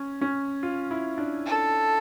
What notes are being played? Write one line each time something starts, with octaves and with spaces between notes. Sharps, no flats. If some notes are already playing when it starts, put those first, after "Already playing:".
Already playing: C#4
C#4
F4
E4
D4
A4